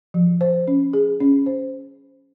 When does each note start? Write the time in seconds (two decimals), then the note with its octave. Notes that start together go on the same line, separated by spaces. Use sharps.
0.14 F3
0.41 C5
0.68 C#4
0.93 G#4
1.20 C#4
1.46 C5